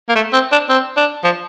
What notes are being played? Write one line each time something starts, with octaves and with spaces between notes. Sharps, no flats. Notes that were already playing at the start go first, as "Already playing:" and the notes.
A#3
A3
C4
D4
C4
D4
F3